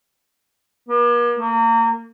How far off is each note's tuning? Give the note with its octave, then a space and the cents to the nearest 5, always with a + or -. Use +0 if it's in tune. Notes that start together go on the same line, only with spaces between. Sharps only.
A#3 +45
A#3 -30